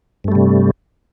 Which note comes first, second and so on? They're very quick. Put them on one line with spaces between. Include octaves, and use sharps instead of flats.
G2 A3 G3 C3